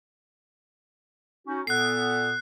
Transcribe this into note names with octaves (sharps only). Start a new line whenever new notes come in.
C#4 D#4 F#4
A#2 B3 A4 F#6 C7